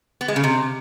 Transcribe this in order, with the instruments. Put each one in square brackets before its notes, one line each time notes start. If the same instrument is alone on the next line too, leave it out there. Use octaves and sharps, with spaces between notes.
[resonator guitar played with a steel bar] B3
G#3
C#3
C3